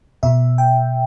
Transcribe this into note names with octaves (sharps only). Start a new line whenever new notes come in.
B2 E5
G5